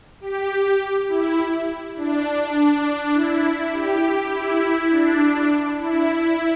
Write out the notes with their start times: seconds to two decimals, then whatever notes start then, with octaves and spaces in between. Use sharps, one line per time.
0.20 G4
1.09 E4
1.96 D4
2.56 D4
3.14 E4
3.73 G4
4.31 E4
4.91 D4
5.79 E4